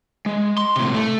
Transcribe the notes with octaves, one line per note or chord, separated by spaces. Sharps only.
G#3
C6
A2 C3
A3